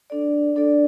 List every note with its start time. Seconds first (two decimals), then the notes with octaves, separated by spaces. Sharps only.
0.10 D4 A4 D5
0.56 D4 A4 D5